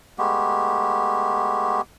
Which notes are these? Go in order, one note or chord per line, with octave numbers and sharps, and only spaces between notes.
G#3 A3 B3 G4